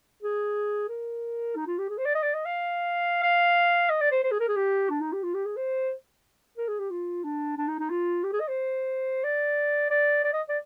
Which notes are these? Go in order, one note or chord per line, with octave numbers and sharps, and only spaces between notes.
G#4
A#4
D#4
F4
G4
G#4
C5
D5
D#5
D5
D#5
F5
F5
D#5
D5
C5
C5
G#4
A#4
G#4
G4
D4
D#4
G4
F4
G4
G#4
C5
A#4
G#4
G4
F4
D4
D4
D#4
D#4
F4
G4
G#4
D#5
C5
D5
D5
D5
D#5
D5